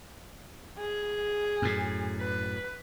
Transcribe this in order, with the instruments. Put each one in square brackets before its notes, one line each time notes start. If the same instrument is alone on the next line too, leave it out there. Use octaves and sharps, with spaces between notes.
[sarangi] G#4
[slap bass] F#2 A2
[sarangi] B4